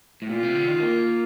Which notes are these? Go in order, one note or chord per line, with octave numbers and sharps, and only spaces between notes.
A2
A#2 F4
C3
D3
D#3
A#3